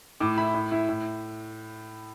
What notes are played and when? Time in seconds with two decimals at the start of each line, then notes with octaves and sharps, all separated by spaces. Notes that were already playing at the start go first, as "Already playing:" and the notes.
0.20 A2 D6
0.38 E4 B5
0.54 A2
0.72 E4
0.89 A2